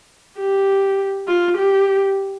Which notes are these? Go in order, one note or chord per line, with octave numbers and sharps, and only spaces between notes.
G4
F4
G4